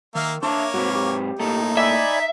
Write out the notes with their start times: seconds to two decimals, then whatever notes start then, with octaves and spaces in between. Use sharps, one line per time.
0.15 D#3 A#3 E5 F5
0.43 A#3 D4 C#5 E5 A5 D6
0.74 G#2 C4 F#4 B4
0.95 G4
1.39 A2 A#3 D#4 A4
1.77 D5 E5 G#5 B5